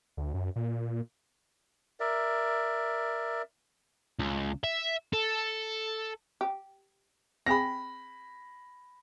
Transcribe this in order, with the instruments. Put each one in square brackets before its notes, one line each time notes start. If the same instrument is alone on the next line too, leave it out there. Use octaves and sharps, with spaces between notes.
[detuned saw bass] D2
F#2
A#2
[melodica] A#4 D5 E5
[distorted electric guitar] C#2
E5
A4
[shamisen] G4
[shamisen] C4 G4 G#4 [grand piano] B5 A#6